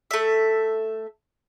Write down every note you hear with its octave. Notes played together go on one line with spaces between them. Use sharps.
A3 E5